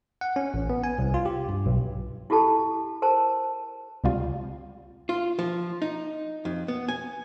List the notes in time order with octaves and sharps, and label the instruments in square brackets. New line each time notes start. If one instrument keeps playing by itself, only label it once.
[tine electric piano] F#5
C#4
A1
B3
G#5
C2
F4
G4
G2
B1
[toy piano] E4 F4 G4 A4 A5
A#4 C5 A5
[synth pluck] C#2 C3 G3 F4
[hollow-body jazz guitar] F4
F3
D#4
F2
B3
G#5